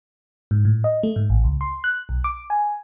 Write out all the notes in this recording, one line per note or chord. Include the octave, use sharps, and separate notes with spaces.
G#2
A2
D#5
A3
G#2
A1
C#2
C6
F#6
B1
D6
G#5